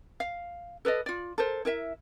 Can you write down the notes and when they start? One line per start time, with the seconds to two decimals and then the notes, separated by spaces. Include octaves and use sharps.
0.20 F5
0.85 A4 B4 D5 D#5
1.06 F4 D5
1.38 A4 A#4 C5
1.65 E4 A#4 E5